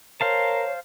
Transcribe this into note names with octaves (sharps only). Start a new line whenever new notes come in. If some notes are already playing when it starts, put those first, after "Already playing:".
A#4 C5 C#5 F5 A5